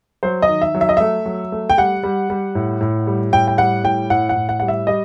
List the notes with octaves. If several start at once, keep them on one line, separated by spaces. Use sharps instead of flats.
F#3 C5
D#5
D#3
E5
F#3
E5
D#5
A3 E5
F#3
A3
G5
G3 F#5
G3
G3
A2
A2
G3
A2 G5
G5
G3 F#5
A2 G5
A2 F#5
F#5
A2
F#5
G3 F#5
E5
G3 D#5